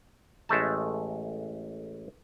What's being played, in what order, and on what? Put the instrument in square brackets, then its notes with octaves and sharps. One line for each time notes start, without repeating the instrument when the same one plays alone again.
[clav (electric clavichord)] A1 G#3 A3 A5